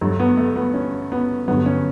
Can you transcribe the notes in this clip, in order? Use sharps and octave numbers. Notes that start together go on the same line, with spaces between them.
G2 F#3 A3
B3
A3
B3
C#4
B3
G2 D3 F#3 B3
C#4